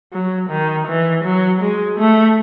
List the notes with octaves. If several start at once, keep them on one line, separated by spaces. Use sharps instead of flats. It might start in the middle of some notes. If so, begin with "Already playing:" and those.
F#3
D#3
E3
F#3
G#3
A3